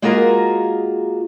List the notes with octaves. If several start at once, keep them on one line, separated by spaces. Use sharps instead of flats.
G#3 A#3 F4 F#4 G#4 A#4